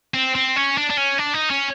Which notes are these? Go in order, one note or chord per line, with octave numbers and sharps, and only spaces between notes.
C4
C4
C#4
D4
D4
C#4
D4
D#4
C#4